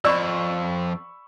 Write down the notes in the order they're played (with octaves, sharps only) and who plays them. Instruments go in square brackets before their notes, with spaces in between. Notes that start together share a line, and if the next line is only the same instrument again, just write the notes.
[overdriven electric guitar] F2 [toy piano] D5 [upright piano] B5 C#6 E6